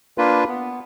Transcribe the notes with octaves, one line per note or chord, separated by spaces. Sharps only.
A#3 D4 F4 B4
B3